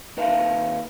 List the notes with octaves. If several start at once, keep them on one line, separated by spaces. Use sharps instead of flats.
D#2 D#3 B4 E5 F5 A5